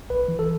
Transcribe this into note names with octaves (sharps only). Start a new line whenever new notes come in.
B1 B4
E3
A4